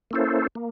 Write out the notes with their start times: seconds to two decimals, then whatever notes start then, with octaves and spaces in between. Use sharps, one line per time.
0.11 A#3 C#4 E4 A4 C5
0.55 A#3